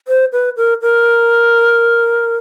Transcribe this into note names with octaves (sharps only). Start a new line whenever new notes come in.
C5
B4
A#4
A#4